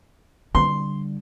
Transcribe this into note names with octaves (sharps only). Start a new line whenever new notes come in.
D3 G3 C6